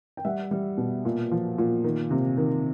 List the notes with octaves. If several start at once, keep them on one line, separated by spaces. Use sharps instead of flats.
G5
G3 E5 F#5
G3
B2
A#2
F3
A#2
D#3
C3
D#3